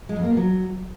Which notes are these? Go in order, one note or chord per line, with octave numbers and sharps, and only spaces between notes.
G#3
F2
A#3
B3
F#3